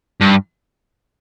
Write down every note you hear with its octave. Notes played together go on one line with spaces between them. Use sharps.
G2